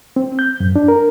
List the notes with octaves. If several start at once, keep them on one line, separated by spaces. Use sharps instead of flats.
C4
G6
F#2
D4
A#4